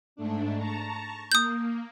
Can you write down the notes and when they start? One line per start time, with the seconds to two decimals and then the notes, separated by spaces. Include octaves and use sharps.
0.16 G#2 A3 D4
0.56 A5 A#5 C#6
1.32 A#3 D#6 G6